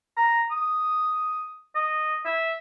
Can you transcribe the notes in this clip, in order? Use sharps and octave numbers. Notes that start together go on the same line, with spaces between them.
A#5
D#6
D#5
E5